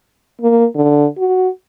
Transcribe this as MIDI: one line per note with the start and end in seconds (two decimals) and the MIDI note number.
0.41 0.65 58
0.75 1.06 50
1.18 1.49 66